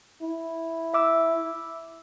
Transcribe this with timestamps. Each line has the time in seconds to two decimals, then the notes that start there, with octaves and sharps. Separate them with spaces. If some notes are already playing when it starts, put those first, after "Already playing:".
0.22 E4
0.94 E5 D6 E6